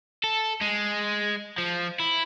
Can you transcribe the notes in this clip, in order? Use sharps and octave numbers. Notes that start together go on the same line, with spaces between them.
A4
G#3
F3
E4